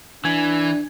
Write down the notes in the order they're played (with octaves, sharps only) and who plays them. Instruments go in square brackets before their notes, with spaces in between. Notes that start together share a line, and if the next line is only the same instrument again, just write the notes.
[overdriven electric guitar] E3 [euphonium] D4 [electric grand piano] G#5 G#6